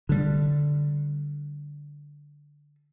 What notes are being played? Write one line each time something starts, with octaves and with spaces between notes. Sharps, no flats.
D3 G3